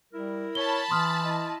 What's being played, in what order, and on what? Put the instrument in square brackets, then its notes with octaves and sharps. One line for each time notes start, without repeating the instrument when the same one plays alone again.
[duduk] G3 [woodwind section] E4 A#4
[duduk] C#5 [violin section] A5 B5 [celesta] G7
[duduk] E3 [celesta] C6 D#6 F6
[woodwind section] E4 D#5